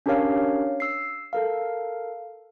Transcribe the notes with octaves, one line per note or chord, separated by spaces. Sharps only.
C#4 D4 G4 A#4 C#5 F5
E6 C7
A4 A#4 F5